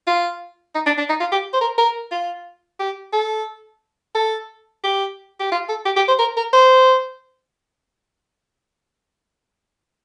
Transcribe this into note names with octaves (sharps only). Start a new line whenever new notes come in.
F4
D#4
D4
D4
D#4
F4
G4
C5
A#4
A#4
F4
G4
A4
A4
G4
G4
F4
A4
G4
G4
C5
A#4
A#4
C5